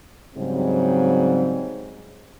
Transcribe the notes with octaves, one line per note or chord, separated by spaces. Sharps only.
G#2 C#3 F#3 G3 C4